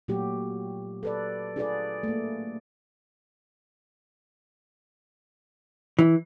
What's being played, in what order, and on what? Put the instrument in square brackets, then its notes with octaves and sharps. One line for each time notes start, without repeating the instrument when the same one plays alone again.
[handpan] A#2 F#3 A3 F#4 G4
A4 B4 D5
D4 F4 G#4 A4 B4 D5
A3 A#3
[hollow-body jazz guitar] E3